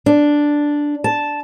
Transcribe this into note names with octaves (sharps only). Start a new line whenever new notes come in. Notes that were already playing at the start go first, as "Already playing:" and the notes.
D4
A5